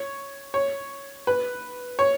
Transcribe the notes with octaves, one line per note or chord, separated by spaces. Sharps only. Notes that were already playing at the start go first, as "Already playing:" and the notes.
Already playing: C#5
C#5
B4
C#5